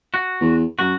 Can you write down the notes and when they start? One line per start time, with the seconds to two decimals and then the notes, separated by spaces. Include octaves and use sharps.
0.14 F#4
0.41 E2
0.79 F#2 F#4